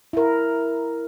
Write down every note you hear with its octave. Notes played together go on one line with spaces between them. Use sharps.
E4 A#4